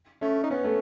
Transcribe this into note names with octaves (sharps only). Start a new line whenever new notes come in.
A3 C#4
D#4
B3 C#4
A3